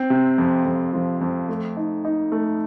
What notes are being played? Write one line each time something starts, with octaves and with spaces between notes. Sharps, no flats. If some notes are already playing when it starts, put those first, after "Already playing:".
Already playing: C4
C3
F2
F2
F3
F2
A3
D#4
D#4
A3